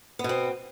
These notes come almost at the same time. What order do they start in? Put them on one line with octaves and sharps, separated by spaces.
B3 B2 C4